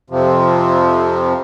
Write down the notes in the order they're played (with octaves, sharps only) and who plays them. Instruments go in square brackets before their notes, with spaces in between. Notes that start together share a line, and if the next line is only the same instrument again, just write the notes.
[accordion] F2 C3 F3